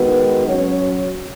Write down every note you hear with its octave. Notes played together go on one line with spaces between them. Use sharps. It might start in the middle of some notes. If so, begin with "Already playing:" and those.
Already playing: D#3 G#3 B3 F#4 B4
F#3 C#4 F#4 C#5